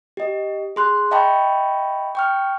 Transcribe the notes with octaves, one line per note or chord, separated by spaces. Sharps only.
G4 D#5
G#4 C6 F#6
D#5 E5 G5 A5 B5 C#6
G5 C#6 F6